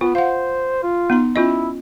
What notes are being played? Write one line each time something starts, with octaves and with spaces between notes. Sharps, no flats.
B3 F4
C5 F5 F#5
F4
B3 D#4 C6
C#4 E4 F4 D#5